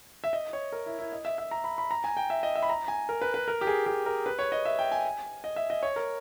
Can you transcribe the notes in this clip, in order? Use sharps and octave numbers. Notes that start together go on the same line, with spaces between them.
E5
D#5
C#5
A#4
E4
E4
D#5
E5
E5
A#5
B5
B5
A#5
G#5
G5
E5
D#5
E5
B5
A#5
G#5
A#4
B4
B4
A#4
G4
G#4
G4
A#4
B4
C#5
D#5
E5
G5
G#5
D#5
E5
D#5
C#5
A#4